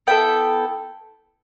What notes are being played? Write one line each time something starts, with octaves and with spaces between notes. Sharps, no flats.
B3 E4 A4 G5